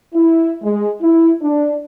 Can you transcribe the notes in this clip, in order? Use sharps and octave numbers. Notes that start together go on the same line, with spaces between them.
E4
G#3
E4
D4